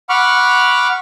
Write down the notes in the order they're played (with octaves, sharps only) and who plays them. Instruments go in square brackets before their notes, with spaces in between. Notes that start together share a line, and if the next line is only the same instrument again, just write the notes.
[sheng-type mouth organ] F#5 B5 C#6 D6 F6